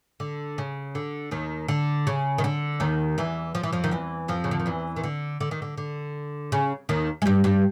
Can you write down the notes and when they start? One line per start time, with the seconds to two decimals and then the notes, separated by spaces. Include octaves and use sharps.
0.20 D3
0.58 C#3
0.95 D3
1.31 D#2 D#3
1.68 D3
2.07 C#3
2.38 D#3
2.44 D3
2.80 D#2 D#3
3.18 E2 E3
3.55 F3
3.63 E3
3.73 F2 F3
3.84 D#3
3.91 E2 E3
4.28 F2 F3
4.44 C#3
4.51 D3
4.60 D#3
4.66 E2 E3
4.96 D#3
5.04 D3
5.41 D3
5.51 D#3
5.62 D3
5.78 D3
6.52 C#3
6.89 D#2 D#3
7.22 G#3
7.26 G2 G3
7.44 G2 G3